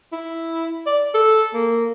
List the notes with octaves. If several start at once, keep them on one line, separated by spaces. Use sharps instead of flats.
E4
D5
A4
A#3